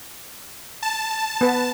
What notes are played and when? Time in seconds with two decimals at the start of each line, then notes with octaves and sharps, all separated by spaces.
0.83 A5
1.41 B3 B4